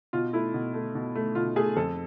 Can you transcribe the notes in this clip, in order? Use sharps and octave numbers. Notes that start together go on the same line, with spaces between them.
B2 F4
A3 E4
B2
A3
B2
A3
B2 F4
A3 G#4
F2 A4